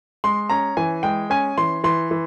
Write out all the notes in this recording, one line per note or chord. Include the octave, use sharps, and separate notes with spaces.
G#3 C6
C#4 A#5
E3 G#5
G#3 G5
C#4 G#5
E3 C6
E3 C6
E3